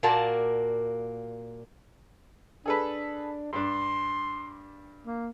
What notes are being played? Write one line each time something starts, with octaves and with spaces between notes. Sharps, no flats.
A#2 A#3 F#4 A#4 D5 A5
D4 G#4 A4 B4
G2 D4 C6
A#3